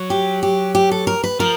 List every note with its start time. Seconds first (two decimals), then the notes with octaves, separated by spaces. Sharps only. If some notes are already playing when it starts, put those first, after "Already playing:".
Already playing: F#3
0.10 G4
0.43 G4
0.75 G4
0.91 A4
1.07 A#4
1.24 B4
1.40 F3 A#4